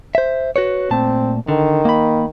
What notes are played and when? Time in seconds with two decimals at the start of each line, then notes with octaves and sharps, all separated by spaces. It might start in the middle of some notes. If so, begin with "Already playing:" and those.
0.15 C5 E5
0.56 F#4 B4 C#5
0.91 A#2 A3 C4 A5
1.49 D3 D#3
1.85 A#3 B5